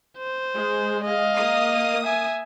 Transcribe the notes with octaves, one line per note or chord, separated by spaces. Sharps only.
C5
G#3
D#5 F5
A#3 D#6
E5 G#5